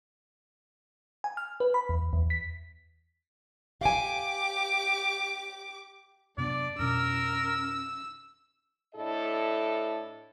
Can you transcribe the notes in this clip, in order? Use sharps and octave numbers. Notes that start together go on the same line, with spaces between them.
G#5
F6
B4
B5
E2
E2
B6
G4 F5 G#5 D6
F#2 C3 B3 D4 D5
F2 B2 C#4 A#4 E6
A2 D4 E4 A4 D#5